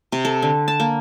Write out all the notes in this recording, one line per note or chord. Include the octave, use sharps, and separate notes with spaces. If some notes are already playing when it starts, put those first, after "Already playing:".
C3
A4
D3
A5
A#3